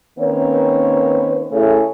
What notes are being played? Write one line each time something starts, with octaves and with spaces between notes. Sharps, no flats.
D#3 A#3 C4 C#4 B4 C#5
C#3 A3 C#4 E4 G#4 C#5